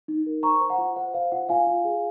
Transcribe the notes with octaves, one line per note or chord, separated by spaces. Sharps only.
D#4
A#4
C5 A#5 C#6
C5
F#5 A#5
F4
C5 F#5
C5 F5
F4 F#5
F4 F5 G#5
F4
G#4